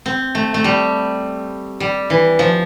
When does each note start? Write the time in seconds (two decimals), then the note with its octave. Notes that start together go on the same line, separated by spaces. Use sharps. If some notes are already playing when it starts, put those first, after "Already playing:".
0.06 C4
0.35 A3
0.54 A3
0.64 G3
1.80 G3
2.10 E3
2.39 F3